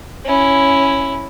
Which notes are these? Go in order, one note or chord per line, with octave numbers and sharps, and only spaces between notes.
C#4 E4